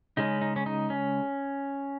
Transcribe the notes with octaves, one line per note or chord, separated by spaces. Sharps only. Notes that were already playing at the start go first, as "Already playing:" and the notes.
C#3 G#3 C#4 D#4
D#4
C#4
D#4
C#4